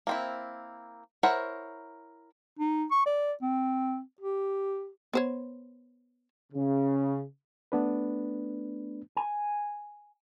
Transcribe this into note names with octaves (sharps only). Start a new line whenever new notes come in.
A#3 C4 E4
E4 A#4 C5 C#5 F#5
D#4
C#6
D5
C4
G4
B3 C5 C#5
C#3
A3 B3 D4 B4
G#5